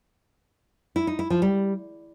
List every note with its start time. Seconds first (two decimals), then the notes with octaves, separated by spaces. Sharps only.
0.96 E4
1.07 D#4
1.19 E4
1.30 F3
1.42 G3